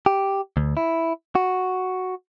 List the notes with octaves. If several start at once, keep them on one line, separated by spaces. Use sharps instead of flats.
G4
D2
E4
F#4